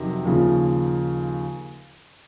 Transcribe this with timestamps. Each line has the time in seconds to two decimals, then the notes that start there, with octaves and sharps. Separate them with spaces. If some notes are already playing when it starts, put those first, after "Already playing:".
Already playing: F2 C3 D#3 F#3
0.25 D#2 C#3 F3